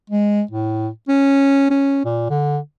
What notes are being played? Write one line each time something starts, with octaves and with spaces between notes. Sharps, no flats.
G#3
A2
C#4
C#4
A#2
D3